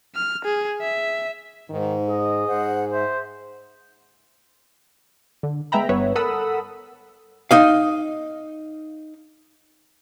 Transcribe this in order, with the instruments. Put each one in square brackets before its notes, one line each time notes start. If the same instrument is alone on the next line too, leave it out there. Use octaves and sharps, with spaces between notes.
[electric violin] F6
G#4
E5
[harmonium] G#2 [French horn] D#3
[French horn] G#4 [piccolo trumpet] D#5
[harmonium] G#2 [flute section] C5 F#5
[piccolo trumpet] C5 [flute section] E5
[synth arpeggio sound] D3
G#3 B3 E5 G5 A#5 B5
G1 B3 B4 C#5 E5
A4 A#4 F#5 B5 D#6 E6
[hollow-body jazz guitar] D#4 D#5 F5